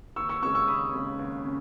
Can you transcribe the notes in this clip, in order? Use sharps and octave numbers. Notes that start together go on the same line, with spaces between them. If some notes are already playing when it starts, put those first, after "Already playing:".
D#2 C#6 E6
C#6 E6
C#3 G#3 C#4 C#6 E6
C#6 E6
D#2 B5 D#6
C#3 G#3 C#4
D#2
C#3